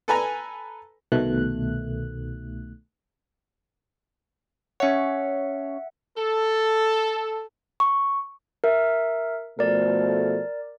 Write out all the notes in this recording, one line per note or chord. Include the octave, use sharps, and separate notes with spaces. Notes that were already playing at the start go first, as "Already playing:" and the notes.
A4 B4 G#5 A#5
C2 B2 D#3 A3 F#6
C#4 C#5 E5 F#5
A4
C#6
A#4 E5
B2 F3 A3 A#4 D5